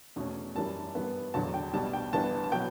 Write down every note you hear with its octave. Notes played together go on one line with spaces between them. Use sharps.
E2 B2 A3 C#4
F#2 E3 G3 A5
G2 E3 B3
E1 E2 D3 F#3 A5
G5
B1 B2 G3 A5
G5
G1 G2 E3 B3 A5
A5
B2 F#3 B3 G5